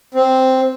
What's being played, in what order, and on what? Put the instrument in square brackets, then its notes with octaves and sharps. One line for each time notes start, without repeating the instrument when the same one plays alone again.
[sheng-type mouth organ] C4